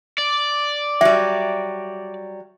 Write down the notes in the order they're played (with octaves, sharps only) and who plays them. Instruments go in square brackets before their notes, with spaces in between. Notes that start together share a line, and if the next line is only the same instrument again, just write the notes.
[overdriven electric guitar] D5
[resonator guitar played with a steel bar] F#3 G3 [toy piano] E5